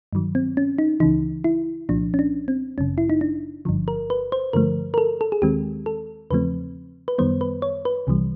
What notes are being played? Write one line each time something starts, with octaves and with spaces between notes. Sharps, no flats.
G2 D#3 F#3
C4
C#4
D#4
C#2 C#3 E3 D#4
E4
C2 A#2 F3 D4
C#4
D4
C4
G1 F#2 C#3 C#4
E4
D#4
D4
G1 G2 D3 F3
A#4
B4
C5
G2 D3 F3 A3 A#4
A#4
A4
A4
G#4
D#2 D#3 G#3 C4 G4
A4
E2 C#3 F3 A3 C4 B4
B4
F#2 D#3 G3 B3 C5
B4
C#5
B4
C2 C3 E3 G3